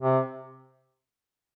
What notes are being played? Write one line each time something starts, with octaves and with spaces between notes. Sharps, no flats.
C3